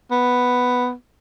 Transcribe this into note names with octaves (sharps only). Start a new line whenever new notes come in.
B3